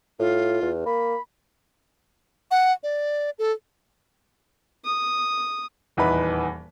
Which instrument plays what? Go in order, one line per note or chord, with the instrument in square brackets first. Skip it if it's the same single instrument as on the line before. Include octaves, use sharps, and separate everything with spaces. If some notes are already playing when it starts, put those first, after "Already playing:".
[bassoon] A2 [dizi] F4
[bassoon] E2
[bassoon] A#3 [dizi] B5
[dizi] F#5
D5
A4
[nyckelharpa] D#6
[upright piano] D#1 E2 E3 D#4 B4 B5